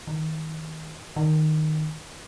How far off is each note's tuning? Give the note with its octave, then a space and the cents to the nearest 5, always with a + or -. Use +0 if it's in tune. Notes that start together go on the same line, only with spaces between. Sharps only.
D#3 +25
D#3 -5